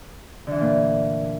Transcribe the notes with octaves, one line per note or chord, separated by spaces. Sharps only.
A#2 D3 E3 D4